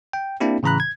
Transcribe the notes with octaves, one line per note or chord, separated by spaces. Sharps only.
G5
A#3 C4 D4 E4 G4
A2 C#3 E3 A#5 B5 F#6
G#6